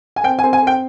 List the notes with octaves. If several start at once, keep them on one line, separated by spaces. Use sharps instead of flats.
G#5
C4 G5
G#5
C4
G#5
C4 G5